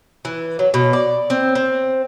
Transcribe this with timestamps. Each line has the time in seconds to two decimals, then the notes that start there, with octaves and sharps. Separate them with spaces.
0.25 E3
0.59 F#3
0.74 B2
0.93 D5
1.30 C4
1.55 C4